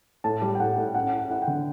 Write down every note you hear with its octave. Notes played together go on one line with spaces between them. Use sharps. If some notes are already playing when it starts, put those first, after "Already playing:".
A2 A5
G3
G5
A2 F#5
A2
C#4 F#5
E4
F#5
E4 F#5
G5
D3